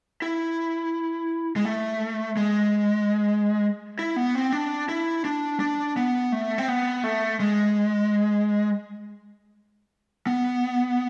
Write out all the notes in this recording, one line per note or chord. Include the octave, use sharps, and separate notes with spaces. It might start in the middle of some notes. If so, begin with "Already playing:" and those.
E4
G#3
A3
G#3
E4
B3
C4
D4
E4
D4
D4
B3
A3
C4
B3
A3
G#3
B3